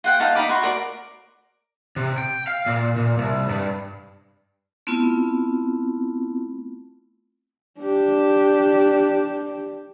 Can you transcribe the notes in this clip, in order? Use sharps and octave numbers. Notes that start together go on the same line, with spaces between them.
F4 F#5 G5
D#4 F5 A5
D#4 A#5 B5 D6
F#4 C6
A#4 D5 D6
C3
G5
F5
A#2
A#2
C2
G2
A3 B3 C4 E4 F4
D4 G4